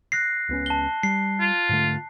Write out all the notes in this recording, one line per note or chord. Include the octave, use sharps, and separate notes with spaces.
F#6 A#6 C7
C#2 B3 C#4
A5 G7
G3 C7
F4
G#2 D3 A3